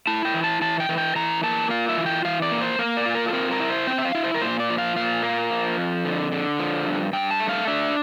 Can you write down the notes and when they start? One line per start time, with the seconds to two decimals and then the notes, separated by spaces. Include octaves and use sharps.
0.07 E4 A5
0.25 G5
0.34 E3
0.44 A5
0.61 E3 A5
0.80 G5
0.89 E3
0.98 G5
1.16 E3 A#5
1.43 A#3 A5
1.70 F4 F5
1.89 E5
1.97 E3
2.06 G5
2.25 E3 F5
2.42 D5
2.52 A#3
2.61 C5
2.79 A#3 F5
2.97 D5
3.06 F4
3.15 A#4
3.28 A4
3.33 C4 A#4
3.51 A#4
3.60 E4
3.70 C5
3.87 C4 G5
3.98 E5
4.05 F5
4.15 E4
4.24 C5
4.34 A#4
4.41 A#2 C5
4.60 D5
4.69 F3
4.78 F5
4.96 A#2 F5
5.23 A#3
5.51 F3
5.78 F2
6.05 D3
6.32 D3
6.59 F3
6.86 G2
7.13 G2 G5
7.31 A5
7.40 A3
7.49 F5
7.67 D4 E5